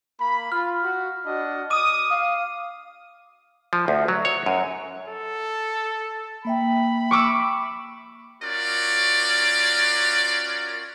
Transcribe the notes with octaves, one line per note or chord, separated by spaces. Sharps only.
A#3 B5
F4 F6
F#4
D4 F#4 D#5
D6 D#6 D#7
F5
F3
D2
F#3
C#5
F#2
A4
A#3 E5 G5 B5
C#6 D6 E6
C#4 F4 F#4 A#4 D5